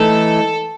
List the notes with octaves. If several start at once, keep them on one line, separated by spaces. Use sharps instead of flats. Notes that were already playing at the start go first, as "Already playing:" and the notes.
Already playing: E3 A3 D#4 A4